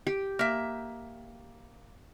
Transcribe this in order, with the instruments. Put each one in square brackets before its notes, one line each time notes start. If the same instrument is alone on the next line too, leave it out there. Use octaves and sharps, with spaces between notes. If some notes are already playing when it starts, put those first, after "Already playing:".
[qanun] G4
[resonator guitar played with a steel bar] A#3 E5